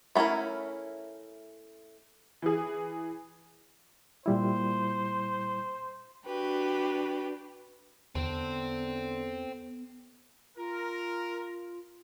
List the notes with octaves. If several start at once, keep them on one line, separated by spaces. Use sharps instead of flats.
A3 B3 C#4 E4 A#4
E3 G#4
A#2 G3 E4 C5
D4 F#4 G4 B4
E2 D3 B3 C4
F4 A#4